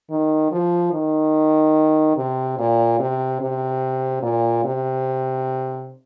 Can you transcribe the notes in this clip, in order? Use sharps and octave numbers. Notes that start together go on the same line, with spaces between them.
D#3
F3
D#3
C3
A#2
C3
C3
A#2
C3